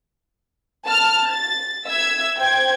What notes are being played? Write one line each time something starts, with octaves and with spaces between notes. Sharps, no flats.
A5 F6
A6
E5 E6 G#6
C5 G5 G#6